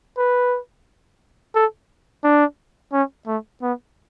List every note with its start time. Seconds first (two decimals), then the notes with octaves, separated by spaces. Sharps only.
0.18 B4
1.55 A4
2.24 D4
2.93 C#4
3.27 A3
3.62 B3